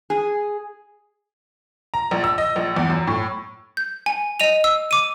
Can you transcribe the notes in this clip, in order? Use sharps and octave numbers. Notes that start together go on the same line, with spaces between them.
G#4
A#5
A#1
E6
D#5
A#1
E2
F#2
A2
G6
G#5
D#5 D#7 F7
E6
D6 D#7